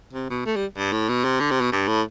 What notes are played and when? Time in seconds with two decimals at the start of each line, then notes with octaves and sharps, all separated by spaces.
0.13 C3
0.30 B2
0.46 A3
0.56 G3
0.77 G2
0.92 A2
1.09 B2
1.24 C3
1.40 D3
1.51 C3
1.61 B2
1.72 G2
1.87 A2